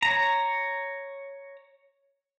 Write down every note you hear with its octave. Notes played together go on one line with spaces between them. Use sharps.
C#5 A#5